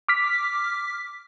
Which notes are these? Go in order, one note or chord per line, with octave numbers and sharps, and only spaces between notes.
D6 F6 B6